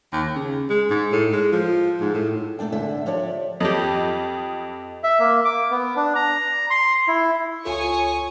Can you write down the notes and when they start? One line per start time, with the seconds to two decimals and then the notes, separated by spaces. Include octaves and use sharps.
0.13 D#2
0.36 C#3
0.70 G#3
0.90 G#2
1.12 A2
1.32 G#3
1.52 F3
2.01 G#2
2.14 A2
2.59 B2 A3 A#3 D4 G5
2.72 D2 G#2 D3 D4 E5
3.06 F3 G4 C#5 D5 E5
3.60 F2 G4 D#5
5.04 E5
5.19 A#3
5.45 D6
5.71 B3
5.96 D4
6.15 A#5
6.70 C6
7.08 E4
7.65 C#2 F4 A4 C#5 G#5 C#6 D#6